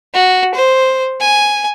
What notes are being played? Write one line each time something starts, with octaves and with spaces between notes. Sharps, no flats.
F#4
C5
G#5